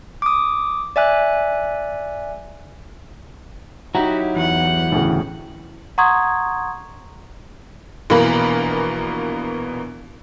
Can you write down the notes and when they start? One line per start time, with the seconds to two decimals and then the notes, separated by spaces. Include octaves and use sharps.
0.22 D6 D#6
0.96 D5 E5 G#5 F#6
3.95 F#3 D#4 E4 F#4 G4 A#5
4.36 E2 F#5
4.92 D2 A2 C#3
5.98 F#5 A#5 C6 C#6 D#6 G#6
8.10 A#1 B2 E3 A#3 A#4 B5